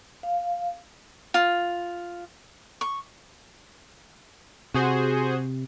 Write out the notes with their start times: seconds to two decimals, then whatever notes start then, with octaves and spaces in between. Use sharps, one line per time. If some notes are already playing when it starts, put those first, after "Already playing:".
0.23 F5
1.34 F4
2.81 C#6
4.74 C3 F#4 G#4 C5